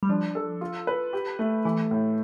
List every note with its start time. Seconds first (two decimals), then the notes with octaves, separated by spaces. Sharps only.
0.03 G3
0.09 F3 D4
0.35 A4
0.61 F4
0.87 B4
1.13 G4
1.39 A3
1.65 E3 A3
1.91 A2